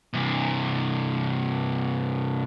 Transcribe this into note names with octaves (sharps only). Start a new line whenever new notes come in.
G2 C3